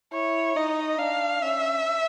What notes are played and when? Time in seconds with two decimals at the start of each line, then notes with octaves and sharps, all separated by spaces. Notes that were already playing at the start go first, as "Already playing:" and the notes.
0.13 E4 C#5
0.56 D#4 D#5
0.98 D4 F5
1.42 C#4 E5